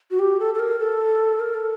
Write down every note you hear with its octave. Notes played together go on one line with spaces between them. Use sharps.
F#4
G4
A4
A4
A#4
A4
A#4
A4